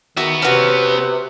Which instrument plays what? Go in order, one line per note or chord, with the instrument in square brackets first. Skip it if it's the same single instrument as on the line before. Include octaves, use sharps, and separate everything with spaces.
[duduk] D#3 [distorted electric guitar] B3 E5 [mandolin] F#4
[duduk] C3 [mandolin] C#4 F#4 [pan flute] B4